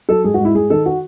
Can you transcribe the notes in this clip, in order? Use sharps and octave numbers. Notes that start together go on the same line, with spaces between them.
F#3 A4
G#2 G#4
F#4
G#2
E4
G#2 G#4
D#3 A4
F#4